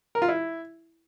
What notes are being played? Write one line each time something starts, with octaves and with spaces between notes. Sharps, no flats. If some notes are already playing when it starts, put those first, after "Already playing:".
A#4
F4
E4